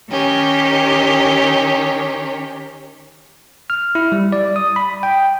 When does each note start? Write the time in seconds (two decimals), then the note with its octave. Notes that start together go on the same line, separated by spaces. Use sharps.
0.10 D#3 C#4 G4
3.70 F6
3.95 E4
4.12 G3
4.32 D5
4.56 D#6
4.76 B5
5.03 G5